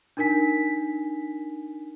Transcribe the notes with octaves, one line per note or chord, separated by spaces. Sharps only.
D4 D#4 A#4 G#5 B6